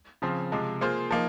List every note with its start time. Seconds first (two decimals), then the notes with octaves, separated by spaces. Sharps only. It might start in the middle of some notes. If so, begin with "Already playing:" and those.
0.22 C#3 F3 C4
0.52 C3 F3 G#3
0.81 A#3 F4 G#4 C5
1.11 F3 A#3 D#4